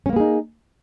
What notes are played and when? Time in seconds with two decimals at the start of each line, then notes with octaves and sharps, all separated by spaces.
0.06 C#4
0.09 A#3
0.13 B3
0.16 G#4
0.20 D#4